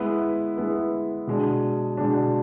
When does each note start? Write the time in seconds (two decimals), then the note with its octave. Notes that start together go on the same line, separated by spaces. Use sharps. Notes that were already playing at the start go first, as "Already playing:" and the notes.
Already playing: G#3 B3 E4 B4
0.57 G#3 B3 E4 B4
1.27 B2 G#3 D4
1.97 B2 G#3 D4